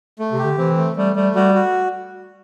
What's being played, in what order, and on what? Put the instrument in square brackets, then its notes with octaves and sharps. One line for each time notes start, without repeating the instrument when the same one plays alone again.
[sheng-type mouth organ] A3
[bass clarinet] C3
[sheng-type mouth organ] G4
[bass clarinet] D3
[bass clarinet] E3 [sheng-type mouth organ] C4
[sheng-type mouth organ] A3
[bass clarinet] G3 [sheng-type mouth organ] A3
[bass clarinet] G3 [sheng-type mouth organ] A3
[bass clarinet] G3 [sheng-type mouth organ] F#4
[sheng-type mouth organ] F#4